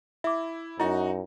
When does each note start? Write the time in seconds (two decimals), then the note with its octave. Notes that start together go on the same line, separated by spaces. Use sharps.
0.24 E4 E5 D6
0.80 F#2 D#4 E4 F#4